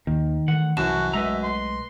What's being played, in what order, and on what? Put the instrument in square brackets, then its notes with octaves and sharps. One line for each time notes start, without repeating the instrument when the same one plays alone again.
[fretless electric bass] D#2 A#3 [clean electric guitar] D#3
[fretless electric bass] D#3 E3 A3 [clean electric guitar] F#5
[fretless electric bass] C2 E3 [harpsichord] F#2 [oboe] F#4 [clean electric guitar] A5
[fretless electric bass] B1 G#3 A3 [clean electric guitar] B4 D#5 A#5 [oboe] E5
[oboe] C6